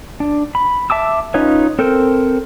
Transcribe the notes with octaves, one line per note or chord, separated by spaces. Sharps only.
D4
B5
E5 A5 D6 E6
C#4 D#4 F4 B4 C#5
C4 A4 A#4 C5